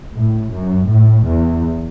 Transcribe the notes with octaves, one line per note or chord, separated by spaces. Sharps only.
A2
F#2
A2
E2